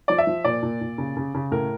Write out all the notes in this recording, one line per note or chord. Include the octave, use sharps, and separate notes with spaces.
F3 D5
E5
F3
A#2 D5
A#2
A#2
C#3
C#3
C#3
A2 A#4